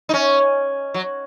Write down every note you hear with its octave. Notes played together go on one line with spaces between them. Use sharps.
D#4
C#4
F#3